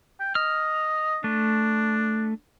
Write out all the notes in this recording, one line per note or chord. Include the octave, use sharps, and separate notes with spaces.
G5
D#5 F6
A3 D4